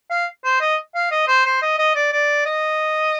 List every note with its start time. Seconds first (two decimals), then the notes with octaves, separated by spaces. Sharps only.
0.10 F5
0.44 C5
0.61 D#5
0.95 F5
1.11 D#5
1.28 C5
1.45 C5
1.62 D#5
1.79 D#5
1.95 D5
2.12 D5
2.46 D#5